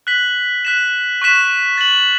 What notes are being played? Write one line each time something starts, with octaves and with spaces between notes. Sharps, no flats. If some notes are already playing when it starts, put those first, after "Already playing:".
F#6 B6 F#7
F#6 B6 E7
C#6 F#6 B6 E7
A6 F#7